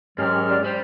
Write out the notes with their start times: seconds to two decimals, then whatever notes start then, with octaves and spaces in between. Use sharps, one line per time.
0.18 G#2 D#3 F#3 C#4 G4 F6
0.49 D5
0.64 G3 C5